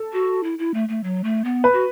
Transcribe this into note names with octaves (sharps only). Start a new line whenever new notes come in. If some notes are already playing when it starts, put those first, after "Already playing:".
Already playing: A4
F#4
E4
E4
A3
A3
F#3
A3
B3
B4
F#4